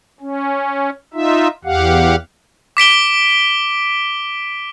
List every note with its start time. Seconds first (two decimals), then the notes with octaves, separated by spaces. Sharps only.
0.20 C#4
1.14 D#4 F4 E5
1.65 E2 G4 F5 F#5
2.77 D6 B6 D7 G7